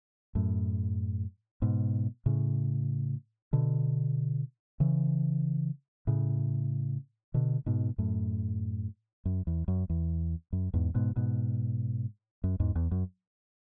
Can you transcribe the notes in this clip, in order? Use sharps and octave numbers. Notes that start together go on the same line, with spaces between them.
F#2 A2
G#2 B2
A2 C#3
B2 D3
C#3 E3
A2 C#3
B2 D3
G#2 B2
F#2 A2
F#2
E2
F#2
E2
F#2
E2 G#2
G#2 B2
G#2 B2
F#2
E2 G#2
E2
F#2